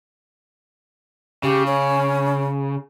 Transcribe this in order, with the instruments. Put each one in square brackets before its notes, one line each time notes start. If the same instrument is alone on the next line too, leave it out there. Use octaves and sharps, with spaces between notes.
[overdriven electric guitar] C#3 [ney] G4
[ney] C#4